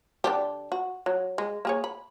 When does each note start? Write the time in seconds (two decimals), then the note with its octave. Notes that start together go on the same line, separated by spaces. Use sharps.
0.24 D3 D4 G4
0.72 F#4
1.06 F#3
1.38 G#3
1.65 A#3 G#4 C#5
1.84 B5